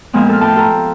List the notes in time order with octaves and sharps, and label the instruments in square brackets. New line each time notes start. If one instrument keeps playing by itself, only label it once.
[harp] A#2 F3 G#3 B3 C4
A4 F6
A2 G5 A5
F4 A4 A#5